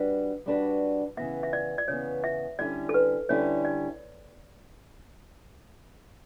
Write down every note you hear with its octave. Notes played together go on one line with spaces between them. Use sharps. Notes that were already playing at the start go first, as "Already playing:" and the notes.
Already playing: G3 D4 F#4 B4
G3 D4 F#4 B4
C#3 E3 B3 E5
E5
D5
D5
C#3 E3 B3 C#5
E5
D3 G3 C#4 E4 D5
A4
B4
D3 G3 C#4 E4 C#5
D5